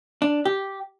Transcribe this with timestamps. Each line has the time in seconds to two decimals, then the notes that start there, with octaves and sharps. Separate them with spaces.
0.22 D4
0.45 G4